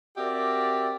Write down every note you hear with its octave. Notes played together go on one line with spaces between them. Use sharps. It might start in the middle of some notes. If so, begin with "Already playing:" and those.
C4 F#4 G4 A#4 D5 E5